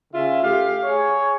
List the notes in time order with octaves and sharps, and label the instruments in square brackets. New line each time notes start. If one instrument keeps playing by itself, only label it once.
[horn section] C#3 F4 E5
A3 G4 F5
G#4 C#5